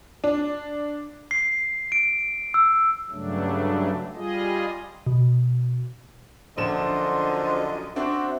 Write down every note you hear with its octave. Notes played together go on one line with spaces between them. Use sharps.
D4
C7
D7
E6
G2 C#3 F#3 A3 D4
G3 F4 G#4 D#5
B2
A#1 F#2 D3 F4 C5 D#5 C6 E7
C4 D4 F#4 C5 E5